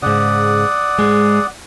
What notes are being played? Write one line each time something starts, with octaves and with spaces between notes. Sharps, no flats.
G#2 C#3 D5 F#5 D#6
G#2 G#3